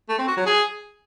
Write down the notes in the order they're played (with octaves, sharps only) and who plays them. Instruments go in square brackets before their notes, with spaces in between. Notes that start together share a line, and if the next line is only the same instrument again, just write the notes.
[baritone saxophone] A3
C4
F#4
F#3
G#4